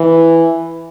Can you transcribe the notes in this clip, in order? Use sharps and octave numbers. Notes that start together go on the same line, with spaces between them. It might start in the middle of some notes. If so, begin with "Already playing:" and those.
Already playing: E3